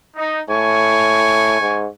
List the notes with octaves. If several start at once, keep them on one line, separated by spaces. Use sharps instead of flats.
D#4
A2 G#5 C#6
G#2